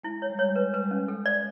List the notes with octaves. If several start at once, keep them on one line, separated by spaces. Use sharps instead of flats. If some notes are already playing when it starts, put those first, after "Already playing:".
G#3 E4
C#5
G3
G#3 C#5
G3
G#3 B4
B4
G3
C#4
G#3 A4
D5